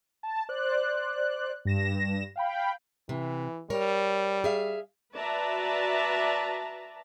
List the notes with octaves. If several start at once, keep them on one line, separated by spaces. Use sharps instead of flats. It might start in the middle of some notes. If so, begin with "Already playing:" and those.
A5
C5 D5 F#6
G2 A#6 E7
F5 G5 B5
C3 E3
G3 A#4 C#5
G#4 E5 F5
F#4 B4 D5 E5 A5 A#5